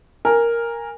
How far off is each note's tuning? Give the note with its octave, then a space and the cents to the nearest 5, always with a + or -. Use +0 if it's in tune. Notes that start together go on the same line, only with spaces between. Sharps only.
A#4 +0 G#5 -15